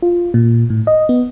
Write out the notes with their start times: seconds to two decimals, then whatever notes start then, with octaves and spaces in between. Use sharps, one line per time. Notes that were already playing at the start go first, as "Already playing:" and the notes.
0.02 F4
0.34 A#2
0.70 A2
0.87 D#5
1.09 B3